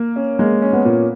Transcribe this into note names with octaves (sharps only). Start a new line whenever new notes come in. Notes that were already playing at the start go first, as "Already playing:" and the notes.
Already playing: A#3
C#4
G#3 A#3
C#4
B3
A#2